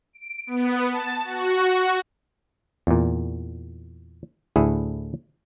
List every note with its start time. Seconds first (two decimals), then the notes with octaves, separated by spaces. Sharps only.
0.13 D7
0.47 B3
0.89 A5
1.24 F#4
2.87 E2 A#2
4.56 D2 A2 E4 G#4 A4